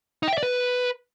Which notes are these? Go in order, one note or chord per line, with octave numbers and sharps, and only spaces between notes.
D#4
G5
E5
D5
B4